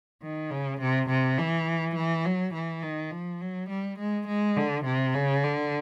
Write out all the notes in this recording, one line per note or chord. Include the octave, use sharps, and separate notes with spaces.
D#3
C#3
C3
C3
E3
E3
F#3
E3
D#3
F3
F#3
G3
G#3
G#3
D3
C3
C#3
D3